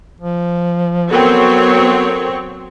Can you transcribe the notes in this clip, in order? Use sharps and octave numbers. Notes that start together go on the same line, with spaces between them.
F3
F#3 B3 C4 A4 A#4 C#5 G5